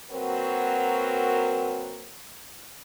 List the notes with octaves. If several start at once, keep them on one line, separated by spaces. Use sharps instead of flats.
F#3 A#3 C4 F#4 A#4 B4